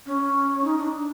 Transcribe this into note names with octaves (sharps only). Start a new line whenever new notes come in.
C#4
D#4
D4